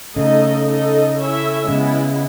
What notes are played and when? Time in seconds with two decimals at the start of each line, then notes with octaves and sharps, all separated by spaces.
0.15 C#3 A3 D#4 A4 D#5
0.67 D#4 A4 D#5
1.18 C#4 E4 A4 E5
1.68 C#3 G#3 B3 E4